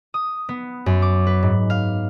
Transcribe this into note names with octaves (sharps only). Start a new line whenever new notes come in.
D#6
B3
F#2
D6
B4
G#2
F5